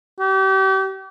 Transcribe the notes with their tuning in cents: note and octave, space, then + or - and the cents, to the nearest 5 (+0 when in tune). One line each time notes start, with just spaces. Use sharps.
G4 -35